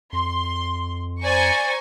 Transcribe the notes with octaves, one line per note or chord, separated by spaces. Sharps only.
F2 C6
C5 D5 G#5 A#5 C#6 G#6